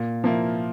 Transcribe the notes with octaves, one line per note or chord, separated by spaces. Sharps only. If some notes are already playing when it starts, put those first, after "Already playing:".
Already playing: A#2
F3 A#3 E4